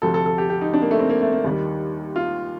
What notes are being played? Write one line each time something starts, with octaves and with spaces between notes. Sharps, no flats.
D2 C3 F3 A4
A4
A4
G4
G4
D#4
D4
A#3
A3
C4
A#3
A3
A#3
D#2 D#3 G3
F4